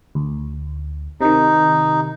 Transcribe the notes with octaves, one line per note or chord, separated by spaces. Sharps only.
D2
C3 D#3 D#4